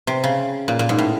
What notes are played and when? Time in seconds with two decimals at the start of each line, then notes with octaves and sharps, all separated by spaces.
0.07 C3
0.24 C#3
0.68 A#2
0.79 A#2
0.89 G#2
0.98 A2